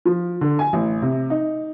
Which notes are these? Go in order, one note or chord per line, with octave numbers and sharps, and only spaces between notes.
F3
D3
G#5
A1
C3
D#4